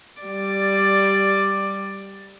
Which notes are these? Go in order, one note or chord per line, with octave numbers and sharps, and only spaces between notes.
G3 D5